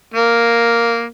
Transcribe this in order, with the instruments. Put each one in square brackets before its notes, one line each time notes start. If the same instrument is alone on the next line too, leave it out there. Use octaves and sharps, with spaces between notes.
[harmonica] A#3